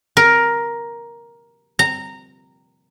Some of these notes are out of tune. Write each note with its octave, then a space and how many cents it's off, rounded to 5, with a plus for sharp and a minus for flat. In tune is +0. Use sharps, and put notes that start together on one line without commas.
A#4 +10
A#5 -15